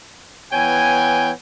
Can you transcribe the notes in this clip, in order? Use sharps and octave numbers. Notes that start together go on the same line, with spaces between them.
E3 B3 C#5 G5 G#5